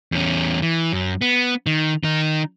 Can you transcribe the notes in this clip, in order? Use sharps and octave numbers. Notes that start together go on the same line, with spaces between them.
E2 C#4
E3
F#2
B3
D#3
D#3 D#4